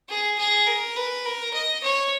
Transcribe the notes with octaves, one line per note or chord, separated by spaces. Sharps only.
G#4
G#4
A#4
B4
A#4
D#5
C#5